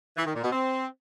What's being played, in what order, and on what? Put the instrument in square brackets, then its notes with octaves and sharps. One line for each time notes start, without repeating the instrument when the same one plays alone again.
[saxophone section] E3
D#3
A#2
B2
C4